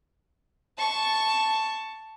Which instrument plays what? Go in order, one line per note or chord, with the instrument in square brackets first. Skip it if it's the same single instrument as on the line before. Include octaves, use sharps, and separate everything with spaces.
[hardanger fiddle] A5 C#6